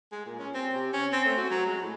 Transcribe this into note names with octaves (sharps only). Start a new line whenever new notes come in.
G#3
A#2
C#4
C4
C3
C#4
C4
A3
F#4
F#3
G#3
A2